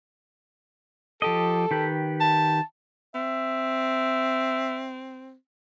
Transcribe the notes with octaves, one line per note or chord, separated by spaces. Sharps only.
F3 G4 A4 D#5
D#3 G4 B4
A5
C4 E5